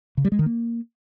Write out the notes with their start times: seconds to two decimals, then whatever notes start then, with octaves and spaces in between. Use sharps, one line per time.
0.17 C#3
0.25 G3
0.32 G#3
0.39 D#3
0.46 A#3